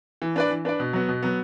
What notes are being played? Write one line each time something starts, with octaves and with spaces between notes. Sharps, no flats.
E3
D4 B4 D5
E3
D4 B4 D5
B2
F#3 B3
B2
F#3 B3